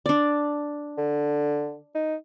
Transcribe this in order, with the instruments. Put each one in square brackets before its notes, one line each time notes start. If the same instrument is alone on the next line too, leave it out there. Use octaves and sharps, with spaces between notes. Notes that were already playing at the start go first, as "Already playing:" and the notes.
[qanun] D4 D5
[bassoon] D3
D#4